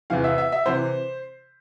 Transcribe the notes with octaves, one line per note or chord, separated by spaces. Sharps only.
E2 C3 E3 F5
E5
E5
E5
C3 E3 C5